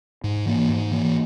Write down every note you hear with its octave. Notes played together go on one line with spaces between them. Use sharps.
G#2
E3 A#3
G#2
E3 A#3